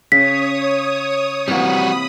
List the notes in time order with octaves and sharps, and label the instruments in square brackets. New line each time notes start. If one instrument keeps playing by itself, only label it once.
[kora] C#3 [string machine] C#5 D#6 [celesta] B6
[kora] C3 E3 A#3 [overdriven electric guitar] G3 F#4 [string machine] B5 D#6